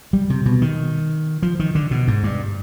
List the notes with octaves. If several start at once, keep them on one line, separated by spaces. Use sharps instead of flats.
G3
C3
B2
D#3
F3
D#3
D3
B2
G#2
G2